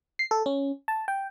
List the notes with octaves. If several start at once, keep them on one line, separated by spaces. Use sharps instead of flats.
C7
A4
C#4
A5
G5